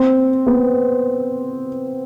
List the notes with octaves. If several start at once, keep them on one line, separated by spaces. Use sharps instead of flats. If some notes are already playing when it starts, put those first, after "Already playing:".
Already playing: C4
B3